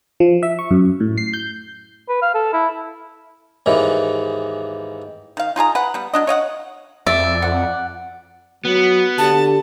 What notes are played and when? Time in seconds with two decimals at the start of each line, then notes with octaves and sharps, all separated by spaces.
0.20 F3
0.43 E5
0.59 C#6
0.71 F#2
1.00 A2
1.18 C7
1.33 G6
2.09 B4
2.22 F5
2.34 A4
2.53 E4
3.66 D#2 G#2 E3
5.37 D#3 F5
5.56 D#4 F4 G#4 A#5
5.75 B4 F#5
5.94 G3 B3
6.14 F#3 D4 D#5
6.27 C#5 D#5 F5 F#5
7.07 F2 D5 E5
7.42 F#5
8.65 F#3 B3 F#4
9.18 D3 G4 A5